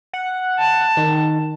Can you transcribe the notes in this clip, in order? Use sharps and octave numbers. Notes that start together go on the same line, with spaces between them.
F#5
A5
D#3